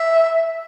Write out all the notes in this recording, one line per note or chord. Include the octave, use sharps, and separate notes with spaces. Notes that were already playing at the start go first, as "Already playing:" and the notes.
Already playing: E5